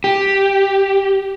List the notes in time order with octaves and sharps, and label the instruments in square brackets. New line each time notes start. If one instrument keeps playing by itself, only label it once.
[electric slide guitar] G4